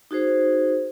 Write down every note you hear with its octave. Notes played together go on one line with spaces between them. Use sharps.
D#4 F#4 G#4 C5